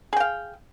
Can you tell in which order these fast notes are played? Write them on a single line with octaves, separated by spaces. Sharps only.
G#4 G5 F5